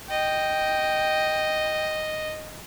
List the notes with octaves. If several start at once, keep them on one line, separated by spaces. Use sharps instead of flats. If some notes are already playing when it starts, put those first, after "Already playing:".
D#5 G5